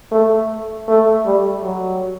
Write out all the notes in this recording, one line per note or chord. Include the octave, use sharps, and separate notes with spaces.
A3
A3
G3
F#3